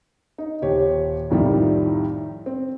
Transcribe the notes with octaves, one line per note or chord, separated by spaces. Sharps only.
D#4
D#1 G4 C#5
C2 F2 A2 D#3 F3 G3
C4